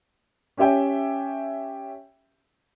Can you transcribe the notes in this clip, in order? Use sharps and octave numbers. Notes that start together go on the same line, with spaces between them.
C#4 G4 C#5 E5 G5 G#5